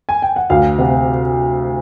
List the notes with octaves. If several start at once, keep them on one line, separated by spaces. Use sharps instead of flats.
G#5
G5
F#5
D2 F5
C3 F#5